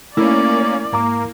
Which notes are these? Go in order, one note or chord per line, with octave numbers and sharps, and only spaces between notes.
A3 A#3 C#4 E4 D5
G#2 A#3 A#5 D6